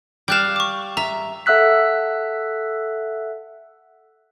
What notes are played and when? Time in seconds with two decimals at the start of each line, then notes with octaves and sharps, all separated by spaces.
0.28 G3 F5 G5 F#6 E7
0.56 C#6 D6
0.97 E5 A#5
1.46 A4 E5 F#5 E6 F#6 B6